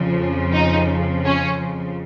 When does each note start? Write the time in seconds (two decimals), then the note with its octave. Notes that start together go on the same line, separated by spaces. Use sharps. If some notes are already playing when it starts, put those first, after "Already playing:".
Already playing: F2 C#3 F3
0.53 D#4
1.25 C#4